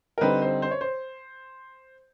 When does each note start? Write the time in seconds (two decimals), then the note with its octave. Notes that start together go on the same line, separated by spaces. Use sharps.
0.18 A#4
0.21 D3 G3 C4 D#4 B4
0.42 C5
0.62 C5
0.71 C#5
0.81 C5